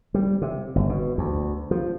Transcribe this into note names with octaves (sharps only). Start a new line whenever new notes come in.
G3
C3
G1
B2
D2
F3